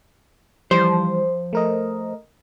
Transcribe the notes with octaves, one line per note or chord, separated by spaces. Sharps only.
E3 F3 G3 C5
A3 A#4 D#5